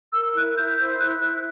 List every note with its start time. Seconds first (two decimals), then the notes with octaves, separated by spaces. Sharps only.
0.14 A#4 E6
0.35 E4 F#6
0.57 E4 G6
0.79 C5 G6
0.99 E4 F#6
1.20 E4 F#6